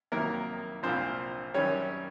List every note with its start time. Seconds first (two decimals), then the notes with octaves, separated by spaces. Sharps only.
0.12 F2 C3 D#3 F#3 A#3 A#4
0.83 C2 A#2 F3 C4 C5
1.54 F#2 D#3 G3 C#4 C#5